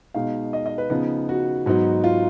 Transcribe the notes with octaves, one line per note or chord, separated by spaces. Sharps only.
B2 G#3 D#4 F5
D#5
D#5
B4
C#3 F3 B3 D#4
F#4
G#2 F#3 B3 D#4
F4